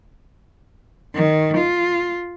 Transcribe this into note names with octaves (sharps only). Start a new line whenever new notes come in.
D#3
F4